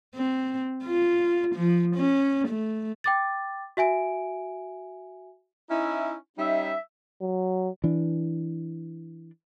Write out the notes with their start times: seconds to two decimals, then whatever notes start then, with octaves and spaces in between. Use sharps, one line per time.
0.14 C4
0.84 F4
1.55 F3
1.96 C#4
2.48 A3
3.04 G5 D6 A6
3.77 F#4 E5 G#5 D7
5.71 C#4 D#4 E4
6.38 G3 C#4 D#4 E5
7.22 F#3
7.84 E3 D4